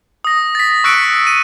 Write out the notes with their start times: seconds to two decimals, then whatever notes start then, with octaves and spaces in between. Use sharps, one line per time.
0.24 D#6 A#6
0.55 A6 B6
0.84 C#6 E6 F#6 B6 C#7 D7
1.27 D#7